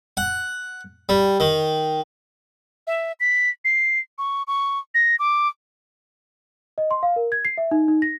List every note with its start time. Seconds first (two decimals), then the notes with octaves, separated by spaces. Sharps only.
0.17 F#5
1.09 G3
1.40 D#3
2.87 E5
3.20 B6
3.65 C7
4.18 C#6
4.47 C#6
4.94 A#6
5.19 D6
6.78 D#5
6.91 C6
7.03 F5
7.16 A#4
7.32 G#6
7.45 C7
7.58 E5
7.71 D#4
7.88 D#4
8.02 A#6